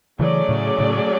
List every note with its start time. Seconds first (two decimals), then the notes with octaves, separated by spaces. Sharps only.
0.20 C#3 E3 F#3 A3 C#4 G#4 D5
0.49 A2 C#3
0.79 A2 C#3